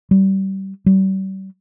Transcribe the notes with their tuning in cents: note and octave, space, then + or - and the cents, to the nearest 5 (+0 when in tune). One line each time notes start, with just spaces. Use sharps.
G3 -25
G3 -40